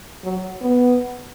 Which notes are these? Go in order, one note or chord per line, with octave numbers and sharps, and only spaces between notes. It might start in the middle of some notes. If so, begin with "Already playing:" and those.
F#3
B3